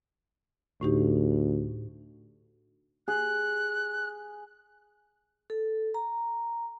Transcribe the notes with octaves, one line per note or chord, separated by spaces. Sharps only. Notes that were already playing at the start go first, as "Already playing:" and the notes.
D2 A2 D#4 G4
G#4 F#6
A4
A#5